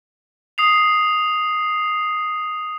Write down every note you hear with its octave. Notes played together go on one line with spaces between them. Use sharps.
D#6 C7 F7